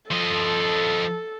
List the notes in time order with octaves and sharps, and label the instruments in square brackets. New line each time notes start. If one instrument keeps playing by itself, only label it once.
[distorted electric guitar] F3 D#5 [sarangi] A4